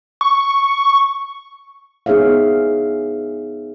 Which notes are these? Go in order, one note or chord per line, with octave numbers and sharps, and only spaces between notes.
C#6
B3 D#4 G#4 C#5 E5 F5